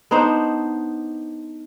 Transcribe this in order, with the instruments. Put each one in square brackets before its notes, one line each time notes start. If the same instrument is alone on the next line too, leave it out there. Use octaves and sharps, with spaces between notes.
[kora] B3 D4 D#4 C5